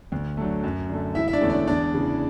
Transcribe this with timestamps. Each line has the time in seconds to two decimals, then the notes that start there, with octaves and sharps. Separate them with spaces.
0.12 D2
0.37 D3 F#3 A3
0.64 F#2
0.89 D3 A3
1.15 E1 E4 E5
1.28 E5
1.33 D4 D5
1.41 E2 D3 A3 C#4
1.50 D4 D5
1.67 E2 D4 D5
1.94 C#3 E3